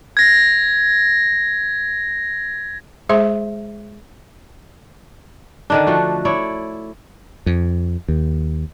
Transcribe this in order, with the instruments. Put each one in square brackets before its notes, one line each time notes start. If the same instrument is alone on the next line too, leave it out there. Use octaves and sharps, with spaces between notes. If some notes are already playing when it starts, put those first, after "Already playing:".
[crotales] G#6 A#6
[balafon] G#3 G#4 C5 E5 C6
[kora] D3 D#3 D4
F3 A3 F#4
E4 C#5 D5
[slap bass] F2
D#2